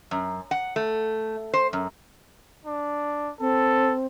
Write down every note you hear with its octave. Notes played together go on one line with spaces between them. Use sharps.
F#2
F#5
A3
C5
F#2
D4
C4 A4